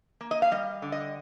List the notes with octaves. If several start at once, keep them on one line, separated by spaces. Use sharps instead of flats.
A#3
D#5
F5
G3 D#5
D3
D#5